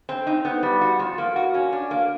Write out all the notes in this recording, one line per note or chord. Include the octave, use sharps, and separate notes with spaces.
C4
D#4
B3
G3
F#4
F3
A#3
F#4
C#4
D4
A#3